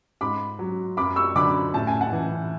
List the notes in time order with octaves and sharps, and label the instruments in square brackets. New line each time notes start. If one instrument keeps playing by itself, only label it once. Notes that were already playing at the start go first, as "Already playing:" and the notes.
[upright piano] G#2 B5 D6
F#3
F#2 B5 D6
C#6 E6
D3 F#3 B5 D6
A2 A5
G#5
F#5 A5
E3